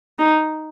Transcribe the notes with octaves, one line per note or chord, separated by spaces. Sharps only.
D#4